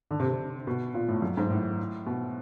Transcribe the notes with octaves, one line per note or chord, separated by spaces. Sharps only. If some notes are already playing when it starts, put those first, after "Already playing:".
D3
C3
C3
B2
A#2
A2
F#2
G#2
A2
B2